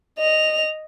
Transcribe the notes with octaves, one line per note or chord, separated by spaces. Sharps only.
D#5 F7